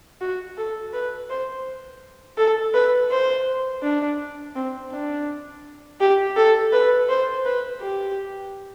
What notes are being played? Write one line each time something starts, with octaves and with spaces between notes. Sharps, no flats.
F#4
A4
B4
C5
A4
B4
C5
D4
C4
D4
G4
A4
B4
C5
B4
G4